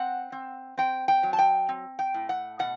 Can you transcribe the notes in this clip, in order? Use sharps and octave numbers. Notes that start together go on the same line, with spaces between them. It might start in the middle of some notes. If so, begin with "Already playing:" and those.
Already playing: C4 F#5
C4
C4 G5
G5
F#3
A5
G5
C4
G5
A2
F#5
B2 F#5